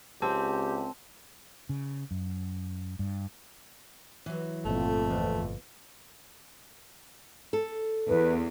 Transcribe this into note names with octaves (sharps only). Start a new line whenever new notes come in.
C#2 C4 G4 A5
C#3
F#2
G2
E3 F#3
G1 F2 A#2 A3
E2
A4
E2 B4